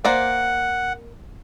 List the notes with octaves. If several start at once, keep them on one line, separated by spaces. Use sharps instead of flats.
A#3 C5 D5 F#5